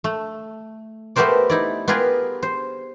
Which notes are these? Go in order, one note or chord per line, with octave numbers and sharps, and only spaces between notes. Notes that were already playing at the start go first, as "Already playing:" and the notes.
A3
A3 B3 G4 A#4 C5 D5
D#4 E4 D5
B3 F4 G4 G#4 A#4 B4
C5